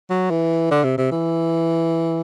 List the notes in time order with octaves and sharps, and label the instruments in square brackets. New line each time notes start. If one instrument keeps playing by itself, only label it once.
[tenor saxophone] F#3
E3
D3
C3
C3
E3